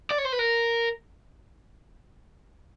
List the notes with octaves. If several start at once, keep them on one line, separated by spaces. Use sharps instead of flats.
D5
C#5
C5
B4
A#4